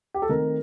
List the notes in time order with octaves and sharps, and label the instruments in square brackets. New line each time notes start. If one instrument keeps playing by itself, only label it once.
[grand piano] G4
A4
D#3 A3 C4 A#4